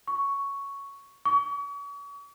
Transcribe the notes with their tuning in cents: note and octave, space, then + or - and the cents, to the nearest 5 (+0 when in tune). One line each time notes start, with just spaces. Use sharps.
C#6 +5
C#6 +40